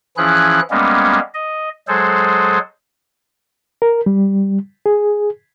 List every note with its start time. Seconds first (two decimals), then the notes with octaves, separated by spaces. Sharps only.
0.17 E3 F3 C#4 E4 G#4 F#6
0.71 G3 G#3 A#3 B3 C#4
1.34 D#5
1.88 F#3 G#3 G#4 A4 C5
3.82 A#4
4.06 G3
4.86 G#4